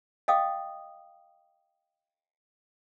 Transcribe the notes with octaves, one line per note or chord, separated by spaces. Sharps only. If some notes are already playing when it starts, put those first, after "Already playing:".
D#5 F5 G5 D6 D#6